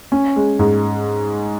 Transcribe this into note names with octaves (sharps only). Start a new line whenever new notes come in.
C#4
G#3
G#2